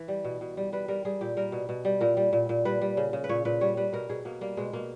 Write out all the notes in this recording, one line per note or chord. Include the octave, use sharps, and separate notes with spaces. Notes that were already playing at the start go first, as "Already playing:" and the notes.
Already playing: E3
G3
B2
B2
G3
G3 B4
G3 A#4
G3 G#4
A#2 G4
G3 A#4
B2
B2
G3
A#2 A#4
G3
A#2
A#2
G3 B4
G3
C#3
C#3
B4
A#2 C#5
A#2 B4
G3 C#5
G3 B4
B2 A#4
B2 G#4
B2 A#3
G3 A#3
B2 G#3
B2 A#3